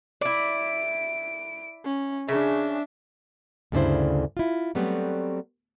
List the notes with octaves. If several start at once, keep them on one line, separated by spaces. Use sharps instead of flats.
E4 D5 D7
C#4
C#3 D4 E5
D2 G2 C#3 D4 E4 C5
E4 F4
F#3 G3 A3 B3 C4 G4